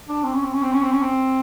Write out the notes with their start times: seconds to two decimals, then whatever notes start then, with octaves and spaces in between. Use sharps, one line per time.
0.08 D4
0.24 C4
0.34 C#4
0.44 C4
0.53 C#4
0.62 C4
0.73 C#4
0.82 C4
0.92 C#4
1.01 C4